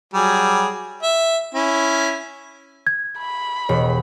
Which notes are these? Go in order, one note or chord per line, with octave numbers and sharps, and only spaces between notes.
F#3 G3 G#4
E5
C#4 E4
G#6
B5
E1 C#5